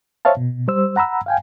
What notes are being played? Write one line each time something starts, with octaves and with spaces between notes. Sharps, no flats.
C5 C#5 E5 F5 A5
B2
G3 C5 E6
F#5 A#5 B5 E6
F5 G5 G#5